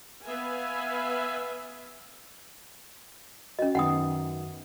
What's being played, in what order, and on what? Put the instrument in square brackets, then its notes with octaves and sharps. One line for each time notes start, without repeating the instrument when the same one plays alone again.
[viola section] B3 B4 E5 F5 G#5
[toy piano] C#4 D#5 [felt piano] F#4
[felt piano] F#2 D#3 B3 [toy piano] F#5 G5 D#6